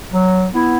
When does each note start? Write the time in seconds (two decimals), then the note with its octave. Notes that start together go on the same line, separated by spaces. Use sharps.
0.12 F#3
0.54 B3 E4